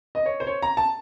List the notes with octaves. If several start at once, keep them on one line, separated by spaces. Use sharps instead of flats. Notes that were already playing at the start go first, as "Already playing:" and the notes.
D#5
C#5
C5
C#5
A#5
A5